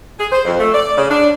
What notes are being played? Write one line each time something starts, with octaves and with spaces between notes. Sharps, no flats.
G#4
C5
F2
A3
D5
C#3
D4